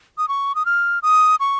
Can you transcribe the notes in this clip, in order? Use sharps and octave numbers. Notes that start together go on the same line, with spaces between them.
D#6
C#6
D#6
F6
D#6
C#6